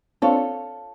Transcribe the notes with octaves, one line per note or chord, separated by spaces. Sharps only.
C4 D4 F4 A4 C#5